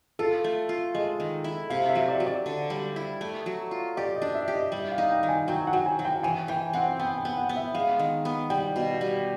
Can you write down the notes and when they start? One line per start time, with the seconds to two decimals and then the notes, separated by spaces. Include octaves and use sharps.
0.19 F4 A4
0.44 A3
0.69 F4
0.94 G#3 D#5
1.20 D#3
1.44 E4
1.70 C3 F5
1.89 E5
1.95 F#3
2.08 D5
2.20 F#3
2.26 D5
2.46 D3
2.70 G3
2.96 E4
3.21 A3
3.46 F#3
3.71 F4
3.97 G4 D5
4.15 D#5
4.22 D4
4.34 E5
4.48 G4
4.54 D#5
4.72 G3 E5
4.92 F5
4.98 D#4
5.10 G5
5.23 D#3
5.29 G#5
5.48 F#3 G5
5.67 F#5
5.73 F#3
5.86 G#5
5.99 F#3
6.05 G5
6.23 E3 G#5
6.48 E3 G5
6.73 C4 F#5
6.99 B3 G5
7.18 G5
7.25 B3
7.37 F#5
7.49 B3
7.56 E5
7.74 G#3 F5
7.99 D#3
8.25 B3
8.50 G3 G5
8.76 B2
9.01 G3